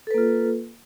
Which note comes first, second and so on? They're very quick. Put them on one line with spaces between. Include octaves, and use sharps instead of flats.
A4 B4 A#3 F4